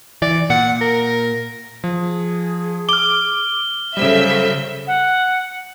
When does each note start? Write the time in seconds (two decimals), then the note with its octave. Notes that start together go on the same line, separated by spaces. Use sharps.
0.22 E3 D5
0.50 A#2 F#5
0.81 A#4
1.84 F3 G#4
2.89 D6 F6 G7
3.97 C#3 F#3 G3 A4 C5 E5
4.87 F#5